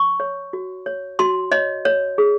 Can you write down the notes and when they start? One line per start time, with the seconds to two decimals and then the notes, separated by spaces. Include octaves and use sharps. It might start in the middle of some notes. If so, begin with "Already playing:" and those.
Already playing: C#6
0.20 C#5
0.53 F#4
0.86 C#5
1.19 F#4 C6
1.52 C#5 D#5
1.85 C#5
2.18 G#4